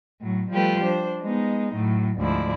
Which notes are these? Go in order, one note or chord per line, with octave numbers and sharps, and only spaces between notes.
A2 F#3
F3 G3 A3 G4 B4
D4 C5
G#3 B3 D#4
A2 F#3
D2 G#2 F3 E4 D5